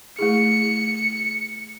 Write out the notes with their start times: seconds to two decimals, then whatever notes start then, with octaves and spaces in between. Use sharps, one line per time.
0.19 A3 E4 G#4 C#7